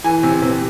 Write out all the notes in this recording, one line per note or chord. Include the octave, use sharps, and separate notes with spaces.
E3 G#5
C3
C3